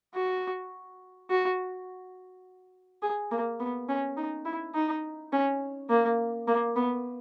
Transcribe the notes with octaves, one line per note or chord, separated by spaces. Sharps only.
F#4
F#4
G#4
A#3
B3
C#4
D#4
E4
D#4
C#4
A#3
A#3
B3